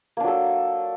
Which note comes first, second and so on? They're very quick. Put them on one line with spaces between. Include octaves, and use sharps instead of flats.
A#3 D4 F#3 A4